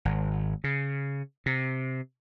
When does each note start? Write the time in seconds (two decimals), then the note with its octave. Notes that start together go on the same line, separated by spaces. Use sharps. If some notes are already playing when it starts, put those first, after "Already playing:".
0.05 G#1
0.64 C#3
1.46 C3